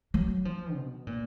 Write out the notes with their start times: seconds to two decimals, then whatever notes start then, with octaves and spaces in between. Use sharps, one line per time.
0.14 F#3
0.45 F3
0.76 B2
1.07 A#2